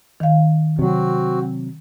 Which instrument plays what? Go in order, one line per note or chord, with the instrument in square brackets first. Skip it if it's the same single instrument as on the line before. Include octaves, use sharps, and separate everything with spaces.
[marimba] D#3 F5
[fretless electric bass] C3 F#3 [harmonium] C4 F#4